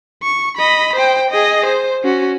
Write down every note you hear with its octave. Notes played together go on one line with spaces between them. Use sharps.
C#6
D#5 B5
C5 G5
G#4 D#5
C5
C#4 F#4